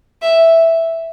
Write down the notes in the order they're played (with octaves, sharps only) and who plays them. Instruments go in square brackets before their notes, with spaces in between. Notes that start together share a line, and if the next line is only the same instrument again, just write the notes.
[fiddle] E5